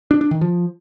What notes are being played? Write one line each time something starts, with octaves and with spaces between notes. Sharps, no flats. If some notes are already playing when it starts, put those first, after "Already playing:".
D4
D4
D#3
F3